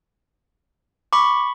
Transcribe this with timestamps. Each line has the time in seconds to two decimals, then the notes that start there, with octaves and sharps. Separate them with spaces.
1.13 B5 C#6 D6